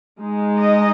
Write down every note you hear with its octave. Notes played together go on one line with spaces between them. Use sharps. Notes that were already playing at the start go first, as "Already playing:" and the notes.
G#3 D#4
D#5